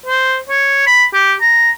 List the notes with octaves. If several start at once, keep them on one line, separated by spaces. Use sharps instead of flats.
C5
C#5
B5
G4
A#5